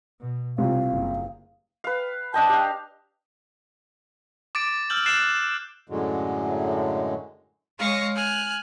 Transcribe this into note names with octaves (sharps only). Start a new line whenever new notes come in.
B2
C2 C3 F4 F5
F#1
B4 F5
D4 D#5 G5 A5
G4 F5
D6 A6 D7
E6 F6 G6 F#7
F#6 A6 C7 D7 E7
F#2 A2 D3 F#3 G#3
G#3 C#5 F5 C#6 A#6
G#5 F6 F#6